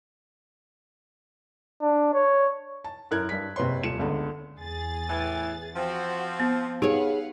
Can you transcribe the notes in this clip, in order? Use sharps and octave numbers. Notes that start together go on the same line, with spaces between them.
D4
C#5
A5
F#2 E4 A#4 F#6 G#6
G2 B6
F#1 C3 B4 C#5 C6
D#1 F4 C#7 E7
G1 C#2 D3
E2 G#4 A6
A2 E3 G#5
F3 C4 F#4
B3
D#4 G4 G#4 B4 C#5 F5 F#5